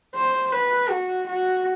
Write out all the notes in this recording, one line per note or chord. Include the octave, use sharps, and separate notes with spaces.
C5
B4
F#4
F#4